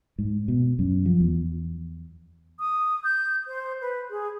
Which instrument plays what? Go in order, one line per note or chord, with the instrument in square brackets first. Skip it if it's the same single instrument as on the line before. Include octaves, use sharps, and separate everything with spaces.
[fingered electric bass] G#2
B2
F#2
F3
E2
[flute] D#6
G6
C5
B4
G#4